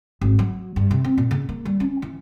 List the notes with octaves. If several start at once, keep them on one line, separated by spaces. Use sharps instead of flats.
G#1
F#3
G2
C3
C4
A#2
C#3
A#3
G3
C#4
E3